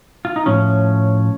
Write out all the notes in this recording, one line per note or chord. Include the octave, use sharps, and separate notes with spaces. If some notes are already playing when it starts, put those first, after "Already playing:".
F4
D#4
A2 F3 C#4